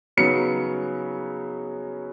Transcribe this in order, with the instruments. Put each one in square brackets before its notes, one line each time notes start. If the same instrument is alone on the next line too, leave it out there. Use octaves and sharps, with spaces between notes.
[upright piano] C#3 F#3 B3 D#4 C#7